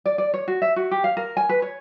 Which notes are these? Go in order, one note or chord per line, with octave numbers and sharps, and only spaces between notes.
D5
D5
C#5
F#4
E5
F#4
G4
F5
A#4
G#5
B4
C#5